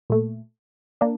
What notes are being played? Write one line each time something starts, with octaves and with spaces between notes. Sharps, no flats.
A#2 A3
A#3 D4